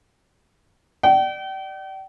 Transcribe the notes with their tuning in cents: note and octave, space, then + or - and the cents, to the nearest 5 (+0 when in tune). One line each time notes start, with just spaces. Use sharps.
D5 +25 G5 -40